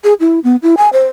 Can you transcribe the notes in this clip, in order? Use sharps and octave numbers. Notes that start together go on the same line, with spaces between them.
G#4
E4
B3
E4
G#5
C5